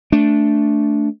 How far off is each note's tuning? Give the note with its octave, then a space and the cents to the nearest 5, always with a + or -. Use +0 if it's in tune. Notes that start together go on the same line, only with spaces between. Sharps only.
A3 +0 D4 -10